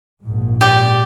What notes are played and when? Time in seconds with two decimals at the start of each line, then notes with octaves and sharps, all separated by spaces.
0.22 A#1 G#2
0.61 G4 D5